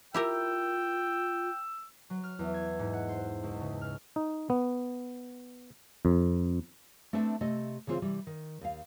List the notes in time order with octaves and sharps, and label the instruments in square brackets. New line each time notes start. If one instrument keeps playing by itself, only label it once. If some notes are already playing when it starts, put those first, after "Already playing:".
[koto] E4 G4 A#4 [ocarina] F4 [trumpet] G5 [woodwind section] E6
[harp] F#3
F6
E2
G#6
G#2
F#5
C5
C#2
C#3
F6
[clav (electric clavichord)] D#4
B3
F2
[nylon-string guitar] A3 C4 D4 B4 E5 A5
C3 A3 D#5
C#3 E3 C4 F4 C5
C3 E3 G3
D#3
D#2 F5